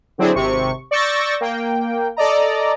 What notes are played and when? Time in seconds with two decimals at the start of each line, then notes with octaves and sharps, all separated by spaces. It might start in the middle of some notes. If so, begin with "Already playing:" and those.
0.18 D3 F#3 C4 D4 E4 G#4
0.35 G#1 C3 C#6
0.91 D5 C#6 E6 G6 A6 A#6
1.41 A#3 G5
2.17 A4 D5 D#5 A#5